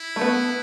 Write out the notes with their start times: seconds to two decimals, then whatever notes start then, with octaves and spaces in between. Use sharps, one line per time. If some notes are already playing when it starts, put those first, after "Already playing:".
Already playing: E4
0.16 A3
0.21 B3